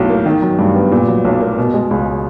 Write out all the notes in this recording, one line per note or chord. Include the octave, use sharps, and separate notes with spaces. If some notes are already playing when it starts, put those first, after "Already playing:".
Already playing: B1 A2 F#3
A#3
D#3
F#3
G2
B3
A#2
F#3
B1
A#3
B2
G#3
C#2